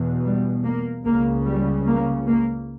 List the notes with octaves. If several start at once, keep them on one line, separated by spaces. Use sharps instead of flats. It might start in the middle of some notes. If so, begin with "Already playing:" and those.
Already playing: E2 B2
G3
A#3
C#2 C#3 A#3
G3
A#3
A#3